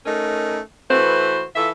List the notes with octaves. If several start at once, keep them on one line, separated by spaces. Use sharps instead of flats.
A3 C#4 D#4 A#4
E3 A3 F#4 B4 C5
E3 F4 A4 E5